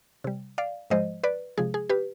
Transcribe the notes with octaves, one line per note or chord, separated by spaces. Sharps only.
C3 G3
D5 F5
G#2 F3 G#3 C5 D#5
B4 D5
C3 F3 G#3 G#4
G#4
G4 B4